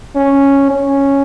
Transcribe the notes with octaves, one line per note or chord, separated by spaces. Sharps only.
C#4
C#4